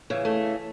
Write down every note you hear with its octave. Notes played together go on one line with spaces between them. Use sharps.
C#3 E3
A3